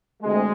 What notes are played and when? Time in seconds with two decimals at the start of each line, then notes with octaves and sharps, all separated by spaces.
0.23 D2 C3 G#3